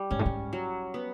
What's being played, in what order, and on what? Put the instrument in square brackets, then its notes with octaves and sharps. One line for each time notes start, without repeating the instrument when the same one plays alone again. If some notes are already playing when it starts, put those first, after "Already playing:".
Already playing: [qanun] G3
[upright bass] G#2 [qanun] C#4
[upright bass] A2
G#2
[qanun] F#3
B3